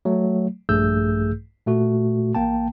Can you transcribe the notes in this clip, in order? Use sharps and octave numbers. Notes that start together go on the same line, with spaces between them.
F#3 A3
A#1 G2 A3 G#4 E6 G6
A#2 A3 F#4
A1 A#3 G5 A5